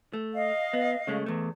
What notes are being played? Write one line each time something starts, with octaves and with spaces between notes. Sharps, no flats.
A3
D#5 F5
B3
C#3 G#3 A3
E2 A3